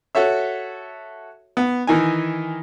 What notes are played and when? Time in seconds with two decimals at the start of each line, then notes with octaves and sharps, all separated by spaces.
0.15 F#4 A4 C#5 E5
1.57 B3
1.87 D#3 E3 D#4 G#5